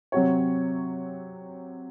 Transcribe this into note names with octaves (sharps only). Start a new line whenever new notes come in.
C3 F#3 C4 F#4 C#5